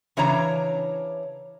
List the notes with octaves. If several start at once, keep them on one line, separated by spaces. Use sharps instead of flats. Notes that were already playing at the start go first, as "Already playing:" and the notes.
C#3 E3 D4 C#5 A#5